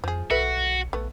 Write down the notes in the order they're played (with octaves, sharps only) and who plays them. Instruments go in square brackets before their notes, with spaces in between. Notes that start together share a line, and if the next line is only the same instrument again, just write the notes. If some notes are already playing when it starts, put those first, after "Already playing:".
[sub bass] F2 [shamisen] F3 G#4
[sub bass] B1 [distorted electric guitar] F#4 [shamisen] A4 B4 E5
[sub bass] A#1 [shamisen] A3 B3